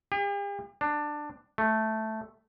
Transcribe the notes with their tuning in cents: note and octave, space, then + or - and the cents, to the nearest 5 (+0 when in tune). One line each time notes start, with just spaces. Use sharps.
G4 +45
D4 +15
A3 -5